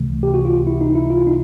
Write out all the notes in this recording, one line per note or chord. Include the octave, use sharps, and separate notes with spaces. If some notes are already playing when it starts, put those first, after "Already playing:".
Already playing: C#2 C3 E3 A3
G4
F#4
F4
E4
D#4
E4
F4
D#4